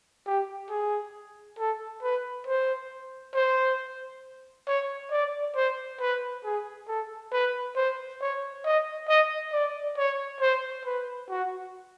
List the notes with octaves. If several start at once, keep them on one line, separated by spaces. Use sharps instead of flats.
G4
G#4
A4
B4
C5
C5
C#5
D5
C5
B4
G#4
A4
B4
C5
C#5
D#5
D#5
D5
C#5
C5
B4
F#4